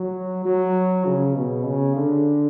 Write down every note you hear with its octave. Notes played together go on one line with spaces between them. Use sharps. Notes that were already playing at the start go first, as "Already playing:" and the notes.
Already playing: F#3
F#3
C#3
B2
C#3
D3